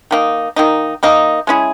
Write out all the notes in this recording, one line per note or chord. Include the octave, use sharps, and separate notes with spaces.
D#3 A#3 D#4
D#3 A#3 D#4
D#3 A#3 D#4
G#3 C#4 E4 G#4